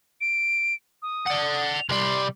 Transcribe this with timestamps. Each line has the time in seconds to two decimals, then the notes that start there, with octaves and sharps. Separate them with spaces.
0.21 D7
1.02 D#6
1.27 D5 F#5
1.74 F7
1.89 C2 G3 C6